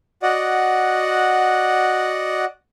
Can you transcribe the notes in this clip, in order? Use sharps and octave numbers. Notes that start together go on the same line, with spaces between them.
F#4 D5 D#5 F#5